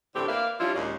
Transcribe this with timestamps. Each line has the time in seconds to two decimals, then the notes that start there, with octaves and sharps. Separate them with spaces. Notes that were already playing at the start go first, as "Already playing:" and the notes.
0.15 A2 D3 E3 C4 D4 G4
0.29 A#3 B4 D5 E5 F5
0.60 G3 C#4 D4 E4 F4
0.75 D#2 A#2 G#3 C#4